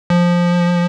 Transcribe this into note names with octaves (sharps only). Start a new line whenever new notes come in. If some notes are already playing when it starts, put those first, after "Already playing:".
F3